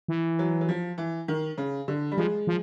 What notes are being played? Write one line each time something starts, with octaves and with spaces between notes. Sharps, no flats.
E3
F#3
F#3
F3
E3
D#3
C#3
D3
G3
F3 G#3
F3